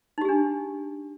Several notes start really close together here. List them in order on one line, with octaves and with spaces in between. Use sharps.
D#4 G4 G#4 D4